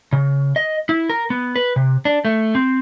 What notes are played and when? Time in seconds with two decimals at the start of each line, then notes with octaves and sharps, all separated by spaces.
0.13 C#3
0.56 D#5
0.89 E4
1.10 A#4
1.30 B3
1.56 B4
1.76 C3
2.05 D4
2.25 A3
2.55 C4